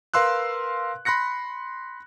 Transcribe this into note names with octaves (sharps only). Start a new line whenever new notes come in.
A#4 B4 F5 C6 E6 F#6
B5 C6 F#6 A#6 C#7